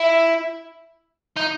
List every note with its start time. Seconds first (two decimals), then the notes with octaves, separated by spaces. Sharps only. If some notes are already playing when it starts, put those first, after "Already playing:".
Already playing: E4
1.36 D#4